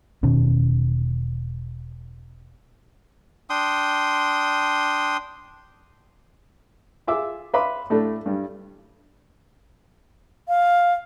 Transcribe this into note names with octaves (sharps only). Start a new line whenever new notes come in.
E1 B2 D#3 C#4
D4 G5 C6 D#6
F4 G#4 E5 D6 E6
B4 E5 F5 B5 C6 D6
A2 A3 D4
G2 G3
F5